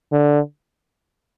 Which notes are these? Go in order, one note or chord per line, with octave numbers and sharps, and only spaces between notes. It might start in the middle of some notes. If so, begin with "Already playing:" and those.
D3